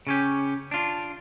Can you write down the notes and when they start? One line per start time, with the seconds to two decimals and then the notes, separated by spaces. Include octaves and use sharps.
0.07 C#3 C#4 G4
0.71 D4 F4